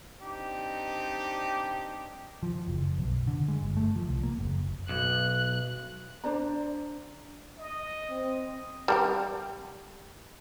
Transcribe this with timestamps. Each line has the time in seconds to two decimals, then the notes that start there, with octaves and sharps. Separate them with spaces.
0.21 C4 D4 D#4 G4
2.43 F3
2.68 F#1
2.99 B1
3.27 D3
3.48 G#3
3.61 G1
3.77 A3
3.96 F3
4.09 C2
4.23 A#3
4.39 F#1
4.89 B1 F#6
6.24 D4 C5 D5 A#5
7.59 D#5
8.09 C4
8.88 G3 A#4 G5